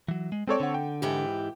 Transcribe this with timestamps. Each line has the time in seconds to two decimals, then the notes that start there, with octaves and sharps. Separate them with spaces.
0.08 E3 F#3
0.32 G#3
0.47 G#3 C4 A4 C#5 D5
0.60 D3 F#5
0.74 G5
1.02 G#2 E3 G4